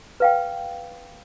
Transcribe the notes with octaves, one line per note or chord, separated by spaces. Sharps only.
B4 F5 G5